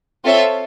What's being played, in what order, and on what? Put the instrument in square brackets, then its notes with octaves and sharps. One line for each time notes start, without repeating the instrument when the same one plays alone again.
[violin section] C4 F4 A4 C#5 E5